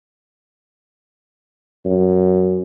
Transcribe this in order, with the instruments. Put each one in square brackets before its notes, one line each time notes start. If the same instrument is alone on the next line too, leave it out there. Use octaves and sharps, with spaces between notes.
[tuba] F#2